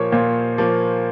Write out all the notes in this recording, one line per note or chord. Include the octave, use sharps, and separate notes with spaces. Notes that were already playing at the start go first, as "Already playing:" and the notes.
Already playing: A#2 F3 A#3 C#5
A#2 C5
F3 A#3